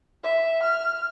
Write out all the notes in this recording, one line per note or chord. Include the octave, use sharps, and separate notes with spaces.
E5
F6